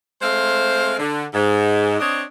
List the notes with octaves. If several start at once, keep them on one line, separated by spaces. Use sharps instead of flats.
G#3 A3 C4 C5 F5
D3
G#2
C4 D4 C#5 D#5